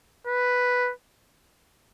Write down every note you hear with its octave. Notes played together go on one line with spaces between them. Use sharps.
B4